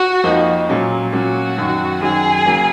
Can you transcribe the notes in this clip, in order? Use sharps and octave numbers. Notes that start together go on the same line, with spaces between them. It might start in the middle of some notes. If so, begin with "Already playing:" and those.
Already playing: F#4
F2 F3 A#3 D#4
A#2 F#3 C#4
A#2 F#3 C#4 F#4
F#2 D#3 F#3
F#2 D#3 F#3 G#4
C#3 F#3 A#3